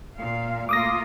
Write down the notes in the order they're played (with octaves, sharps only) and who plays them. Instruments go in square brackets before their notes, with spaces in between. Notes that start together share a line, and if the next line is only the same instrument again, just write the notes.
[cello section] A#2 F5
[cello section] A3 A#3 F4 [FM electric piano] D6 D#6 A#6